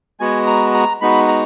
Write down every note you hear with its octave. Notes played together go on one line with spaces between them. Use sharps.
G#3 B3 F#4 G#5
A#5
A#5
G#3 B3 D#4 F#4 B5
A#5